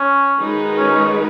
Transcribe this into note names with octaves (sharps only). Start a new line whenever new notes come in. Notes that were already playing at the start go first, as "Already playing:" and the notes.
Already playing: C#4
D#3 G#3 D#4 F#4 B4
C#4